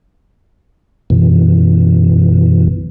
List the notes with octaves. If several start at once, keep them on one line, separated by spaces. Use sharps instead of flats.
F#2 B2 E3